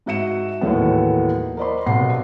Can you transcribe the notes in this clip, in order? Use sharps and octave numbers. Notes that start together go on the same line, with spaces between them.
G#2 F#4 E5 C#7 E7
D#2 A2 E3 F#3 A3 B3
A#4 C5 D5 D#5 B5 C6
B1 C3 B3 F#5 C7